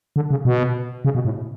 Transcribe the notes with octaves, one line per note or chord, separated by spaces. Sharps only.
D3
C#3
B2
C#3
B2
A2